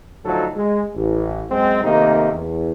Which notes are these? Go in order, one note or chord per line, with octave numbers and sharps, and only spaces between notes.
D2 F3 F#3 D#4 F#4 A4
G#3
A1
F#2 G#3 C4
C3 D#3 A3 A#3 D#4
E2